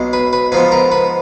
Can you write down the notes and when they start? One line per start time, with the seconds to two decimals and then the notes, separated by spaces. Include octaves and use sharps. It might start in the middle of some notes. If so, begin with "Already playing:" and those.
Already playing: B1 B2 G#3
0.13 B4
0.33 B4
0.52 G#2 F3 B3 B4
0.72 A#4
0.92 B4